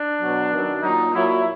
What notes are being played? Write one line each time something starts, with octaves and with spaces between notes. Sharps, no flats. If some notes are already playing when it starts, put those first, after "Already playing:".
Already playing: D4
B2 F#3
F#2 D#3 F#3
A#2 F#3 D#4
A#2 F#3 E4